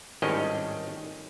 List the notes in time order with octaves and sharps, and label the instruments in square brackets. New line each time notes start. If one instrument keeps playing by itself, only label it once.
[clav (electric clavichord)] G#1 A2 D#3 G3 C#4 D#5